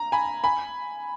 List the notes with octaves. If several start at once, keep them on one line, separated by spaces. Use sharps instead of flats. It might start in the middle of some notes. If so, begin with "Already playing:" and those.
Already playing: A#5
G#5 B5
G#5 B5